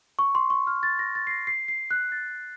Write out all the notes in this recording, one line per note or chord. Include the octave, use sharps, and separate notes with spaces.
C#6
C6
C#6
F6
A6
A#6
A6
C7
A#6
C7
C7
F#6
A6